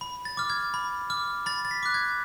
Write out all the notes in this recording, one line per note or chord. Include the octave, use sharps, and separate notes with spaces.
B5
A6
D6 F6
G#6
B5
D6 F6
B5 A6
A6
B6
D6 F#6
G#6